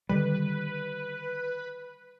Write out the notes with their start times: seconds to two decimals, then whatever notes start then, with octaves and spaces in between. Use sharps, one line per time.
0.09 D3 D#3 G3 B4